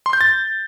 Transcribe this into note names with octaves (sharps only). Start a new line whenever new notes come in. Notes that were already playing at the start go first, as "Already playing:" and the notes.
C6
G6
A6